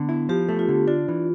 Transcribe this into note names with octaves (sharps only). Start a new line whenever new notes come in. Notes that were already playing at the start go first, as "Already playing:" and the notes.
Already playing: D3 B3
E4
F3 G4
A3
F4
D3
D4 F4
E3